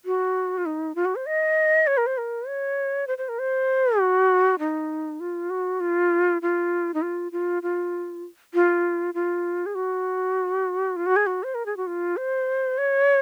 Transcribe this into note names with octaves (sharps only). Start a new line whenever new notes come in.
F#4
F4
D#4
F4
F#4
C5
D#5
C#5
A#4
C5
A#4
C#5
C5
C5
A#4
C5
F#4
D#4
F4
F#4
F4
F4
D#4
F4
F4
F4
F4
F4
G#4
F#4
F4
F#4
G#4
F#4
C5
A#4
G#4
F#4
F4
C5
C#5